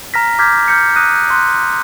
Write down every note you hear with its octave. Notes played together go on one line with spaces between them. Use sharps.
A#5 F6 A#6 B6
D6 F6 G6 G#6 B6
F6 G6 C#7
D#6 F#6 G6 A#6 D#7
F#6
C6 F#6